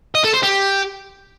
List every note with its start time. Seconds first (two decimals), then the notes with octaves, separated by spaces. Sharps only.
0.15 D#5
0.24 A4
0.34 C5
0.43 G4